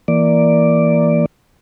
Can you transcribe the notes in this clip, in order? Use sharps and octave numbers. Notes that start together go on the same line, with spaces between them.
E3 A#3 D5